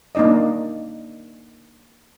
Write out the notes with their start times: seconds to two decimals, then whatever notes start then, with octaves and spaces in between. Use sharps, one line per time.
0.15 A#3 D4 D#4 D5 D#5